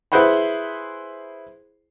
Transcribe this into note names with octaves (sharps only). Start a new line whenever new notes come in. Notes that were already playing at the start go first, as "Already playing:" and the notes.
E4 G#4 B4 C5 F#5 B5